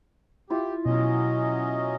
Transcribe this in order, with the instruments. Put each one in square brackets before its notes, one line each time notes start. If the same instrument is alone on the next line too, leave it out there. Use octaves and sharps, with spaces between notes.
[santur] E4 F4 [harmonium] G4
[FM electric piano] B2 [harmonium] F#3 C#4 D#5